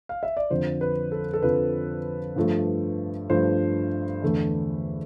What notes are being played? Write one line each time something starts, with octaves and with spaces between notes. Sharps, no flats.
F5
E5
D5
F2 D3 F3 C5
B4
A4
A4
F2 D3 F3 B4
G2 F3 A3
G2 F3 A3 C5
E2 D3 A3